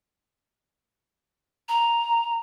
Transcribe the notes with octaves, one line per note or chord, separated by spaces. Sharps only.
A#5